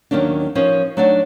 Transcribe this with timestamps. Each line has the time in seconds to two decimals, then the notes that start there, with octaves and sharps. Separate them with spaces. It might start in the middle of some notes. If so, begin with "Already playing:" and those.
0.11 D#2 D#3 F#3 A#3 C#4 D4
0.55 F3 C#4 D#4 A#4 C5
0.97 F#3 A3 D4 D#4 D5 F#5